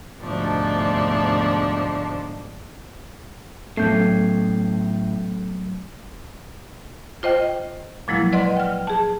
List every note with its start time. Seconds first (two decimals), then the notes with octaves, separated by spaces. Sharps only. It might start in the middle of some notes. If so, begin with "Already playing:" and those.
0.22 D2 G#2 B2 F3 A3 D4
3.77 A2 F#3 A3 B3 C#4 A4 G6 C7
7.23 F4 C5 D#5 G5
8.08 A#2 F3 F#3 G#3 A#3 E4
8.33 B4 D5 D#5 F#5 C6
8.57 G5 F6
8.87 G#4 A5